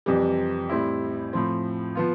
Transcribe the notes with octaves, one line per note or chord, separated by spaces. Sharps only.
F2 C3 E3 G3
A2 G3 C4 E4
A2 F3 C4
F3 B3 F4